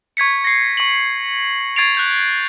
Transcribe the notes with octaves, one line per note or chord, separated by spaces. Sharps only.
C#6 G#6 B6 C#7
A#6 C7
C#6 F#7
C#6 G#6 A6 C7 D7 F7
F#6 G6 F7